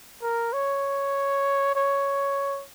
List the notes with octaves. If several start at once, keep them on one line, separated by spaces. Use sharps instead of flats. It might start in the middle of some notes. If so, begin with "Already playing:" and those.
A#4
C#5
C#5